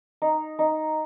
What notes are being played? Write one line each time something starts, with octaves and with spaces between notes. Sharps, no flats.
D#4
D#4